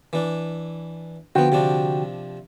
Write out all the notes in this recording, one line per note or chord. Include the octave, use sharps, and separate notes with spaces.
E3 D4
D3 F3 B3 F#4 G5
C3 F3 D4